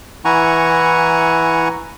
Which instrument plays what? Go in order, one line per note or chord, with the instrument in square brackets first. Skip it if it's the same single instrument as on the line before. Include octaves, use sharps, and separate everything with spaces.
[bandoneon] E3 E4 F#5 G#5 A#5 C#6